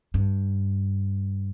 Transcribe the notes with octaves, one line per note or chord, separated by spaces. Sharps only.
G2